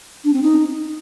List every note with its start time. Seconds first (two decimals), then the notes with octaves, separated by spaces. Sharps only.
0.24 D4
0.33 C4
0.42 D#4